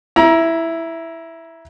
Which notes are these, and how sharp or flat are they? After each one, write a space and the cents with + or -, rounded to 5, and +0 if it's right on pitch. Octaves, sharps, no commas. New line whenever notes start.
E4 +0 A#5 +30